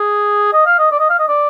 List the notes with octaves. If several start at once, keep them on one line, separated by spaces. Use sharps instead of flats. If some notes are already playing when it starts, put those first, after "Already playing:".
Already playing: G#4
D#5
F5
D#5
D5
D#5
F5
D#5
D5